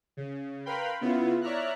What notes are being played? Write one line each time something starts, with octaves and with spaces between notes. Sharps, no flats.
C#3
A#4 B4 F5 G5 B5 C6
C#3 B3 E4 F4
C#5 D5 E5 A#5 F6 F#6